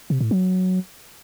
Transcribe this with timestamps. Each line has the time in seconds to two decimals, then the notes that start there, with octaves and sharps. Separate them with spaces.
0.10 C3
0.21 A2
0.31 F#3